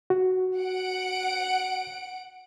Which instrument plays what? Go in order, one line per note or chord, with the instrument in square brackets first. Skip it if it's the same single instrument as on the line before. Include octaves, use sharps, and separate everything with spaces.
[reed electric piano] F#4
[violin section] F#5 D7